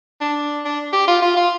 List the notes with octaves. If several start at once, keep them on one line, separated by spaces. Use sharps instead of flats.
D4
D4
G4
F4
F4
F4